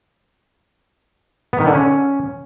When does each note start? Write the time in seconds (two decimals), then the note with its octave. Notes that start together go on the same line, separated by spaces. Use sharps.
1.53 B3
1.60 D#3
1.67 D3
1.74 C#4